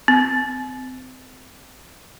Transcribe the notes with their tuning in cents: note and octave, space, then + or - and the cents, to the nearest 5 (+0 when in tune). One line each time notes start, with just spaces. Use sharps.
C4 -30